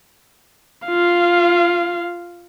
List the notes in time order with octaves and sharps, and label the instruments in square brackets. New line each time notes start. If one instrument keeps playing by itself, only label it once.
[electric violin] F4 F5